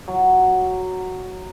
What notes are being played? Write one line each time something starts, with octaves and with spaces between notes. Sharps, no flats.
F#3